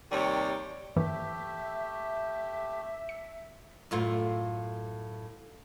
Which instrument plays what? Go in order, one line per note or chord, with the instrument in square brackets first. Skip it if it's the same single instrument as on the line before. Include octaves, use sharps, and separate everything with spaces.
[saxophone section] D#2 C3 G3 C#5
[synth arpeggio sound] G2 E3 A#3 [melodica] A3 G4 [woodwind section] E5
[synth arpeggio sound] C#7
[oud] F#2 A2 F4